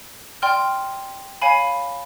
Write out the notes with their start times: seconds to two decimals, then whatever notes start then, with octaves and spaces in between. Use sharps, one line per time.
0.42 D5 G5 C6 F6
1.42 C#5 F5 G#5 B5